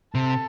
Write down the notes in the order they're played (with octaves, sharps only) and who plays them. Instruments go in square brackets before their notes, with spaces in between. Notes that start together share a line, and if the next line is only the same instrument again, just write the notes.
[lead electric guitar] C3 [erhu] A4